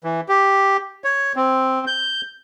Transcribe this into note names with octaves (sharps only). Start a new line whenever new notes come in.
E3
G4
C#5
C4
G6